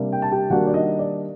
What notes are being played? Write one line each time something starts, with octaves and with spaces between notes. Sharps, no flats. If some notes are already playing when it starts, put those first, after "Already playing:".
Already playing: C3 G3 A#3 D4
G5
A5
G4 G5
D#3 G3 A#3 D4 F#4 F#5
D5
D#4 D#5
D5